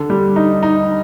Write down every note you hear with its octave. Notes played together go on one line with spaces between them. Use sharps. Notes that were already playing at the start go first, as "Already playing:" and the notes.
Already playing: D3
G3
D#4
D#4